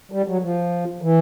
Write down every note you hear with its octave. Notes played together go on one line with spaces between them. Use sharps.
G3
F#3
F3
E3